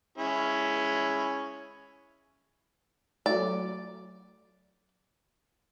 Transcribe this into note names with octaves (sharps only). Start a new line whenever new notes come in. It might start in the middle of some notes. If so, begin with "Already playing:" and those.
G#3 C#4 E4
F#3 A3 D5